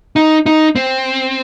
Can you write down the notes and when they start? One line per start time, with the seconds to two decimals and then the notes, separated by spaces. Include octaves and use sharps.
0.16 D#4
0.46 D#4
0.76 C4